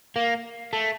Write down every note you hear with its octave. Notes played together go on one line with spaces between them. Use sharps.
A#3
A3